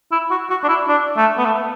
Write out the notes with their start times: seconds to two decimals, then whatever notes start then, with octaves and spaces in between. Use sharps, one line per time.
0.12 E4
0.31 F#4
0.50 F#4
0.64 D4
0.68 E4
0.88 D4
1.17 A3
1.38 B3
1.45 A3